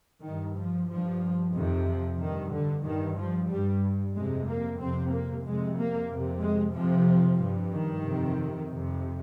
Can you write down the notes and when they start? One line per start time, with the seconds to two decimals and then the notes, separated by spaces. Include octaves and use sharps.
0.24 G2 D#3
0.57 F3
0.89 G2 F3
1.54 F2 C3 D#3
1.87 F3
2.19 G2 D#3
2.52 D3
2.84 G2 D#3
3.17 F3
3.49 G2 G3
4.14 F2 C3 G#3
4.46 A#3
4.79 F2 C3 C4
5.11 A#3
5.44 F2 C3 G#3
5.77 A#3
6.09 F2 C3
6.41 G#3
6.73 F2 C3 F3
7.38 G2
7.70 D#3
8.03 F2 C3
8.69 F2 C3